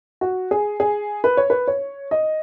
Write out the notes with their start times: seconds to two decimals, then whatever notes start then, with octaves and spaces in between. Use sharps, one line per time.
0.21 F#4
0.51 G#4
0.80 G#4
1.24 B4
1.37 C#5
1.50 B4
1.67 C#5
2.11 D#5